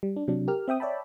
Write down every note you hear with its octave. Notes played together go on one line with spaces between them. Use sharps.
G3
D4
C3 F#3 D4
G4 A#4 F6
C4 E5 G5 D#6
C#5 D5 E5 G5 A5 B5